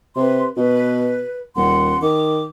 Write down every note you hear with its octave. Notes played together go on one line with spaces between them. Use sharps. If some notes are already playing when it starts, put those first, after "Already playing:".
C3 B4 C6
B2 B4
D#1 F#5 C6
D#3 D6